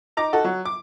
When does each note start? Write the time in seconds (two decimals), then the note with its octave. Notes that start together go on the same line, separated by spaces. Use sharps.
0.17 D#4 A#5 D6
0.33 D#4 F#4 A4
0.44 F#3
0.65 D6